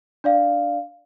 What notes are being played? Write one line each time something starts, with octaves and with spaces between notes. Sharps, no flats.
D4 D5 F5